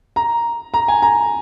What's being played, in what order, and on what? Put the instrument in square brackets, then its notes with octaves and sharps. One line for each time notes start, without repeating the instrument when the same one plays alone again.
[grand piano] A#5
A#5
G#5
A#5